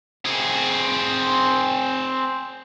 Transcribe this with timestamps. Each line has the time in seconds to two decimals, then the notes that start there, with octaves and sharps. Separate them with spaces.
0.25 C4 G#4